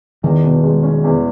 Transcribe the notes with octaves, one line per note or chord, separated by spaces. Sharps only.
E2 D#3
B2
G#3
C#4
E2